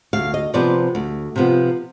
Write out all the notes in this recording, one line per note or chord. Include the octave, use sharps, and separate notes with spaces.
D2 F5
D#5
C3 F3 B3 D5
D2
C3 F3 B3